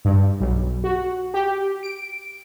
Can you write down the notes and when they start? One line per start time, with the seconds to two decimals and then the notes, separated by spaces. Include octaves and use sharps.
0.05 G2
0.40 B1
0.84 F#4
1.34 G4
1.83 D7